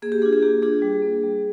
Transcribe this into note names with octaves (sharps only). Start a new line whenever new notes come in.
A#3 G#4
G4
D4 F4 G#4
G#4
A#3 G4
D4 F4 G#4
G3
A#3 D4
G3